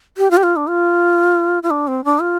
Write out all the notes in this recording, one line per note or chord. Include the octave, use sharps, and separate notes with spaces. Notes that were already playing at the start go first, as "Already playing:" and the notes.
G4
F4
G4
F4
D4
F4
F4
D4
C4
D4
F4